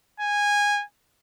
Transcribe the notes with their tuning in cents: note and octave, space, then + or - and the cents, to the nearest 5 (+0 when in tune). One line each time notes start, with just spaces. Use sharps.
G#5 -15